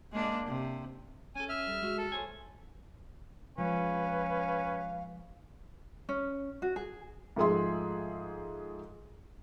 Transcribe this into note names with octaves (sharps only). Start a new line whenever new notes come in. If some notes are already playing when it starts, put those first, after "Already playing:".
G#3 A#3 D4
C3
C#4 A4 G#5
E5 F6
G3
G#3 F#4
A4
C5 C#5 G#5
F3 G#3 C#4 B4 F5
C#4
F#4
G#4
G#2 F3 A3 G#4 E5 C6